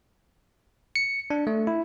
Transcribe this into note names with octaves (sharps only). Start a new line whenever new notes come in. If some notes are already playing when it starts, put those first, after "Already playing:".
C#7
D4
A3
E4